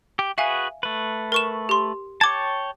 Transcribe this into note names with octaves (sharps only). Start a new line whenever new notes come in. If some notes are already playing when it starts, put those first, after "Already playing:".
G4
F#4 G#4 B4 E5 F5 G#5
A3 B4
A#4 C#6 E7
G4 C6
C#5 G5 A5 D6 G#6